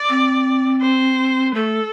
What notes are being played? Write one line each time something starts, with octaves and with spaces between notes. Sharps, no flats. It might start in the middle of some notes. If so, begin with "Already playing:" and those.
Already playing: D5
C4
C5
A3 A4